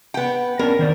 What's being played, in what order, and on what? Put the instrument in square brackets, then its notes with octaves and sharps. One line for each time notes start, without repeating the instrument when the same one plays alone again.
[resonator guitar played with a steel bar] B3 G5
[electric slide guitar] B3 C#4 D4 [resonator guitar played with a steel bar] A#4
[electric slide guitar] D#3 C5 D5